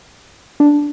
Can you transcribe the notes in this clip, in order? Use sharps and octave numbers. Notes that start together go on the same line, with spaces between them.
D4